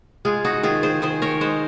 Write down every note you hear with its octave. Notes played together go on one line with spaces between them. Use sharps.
G#3 F4 G#4
D#4 F#4
D#3 F4 G#4
G#4 C5
D#3 G#4 C5
A#4 C#5
G#3 C5 D#5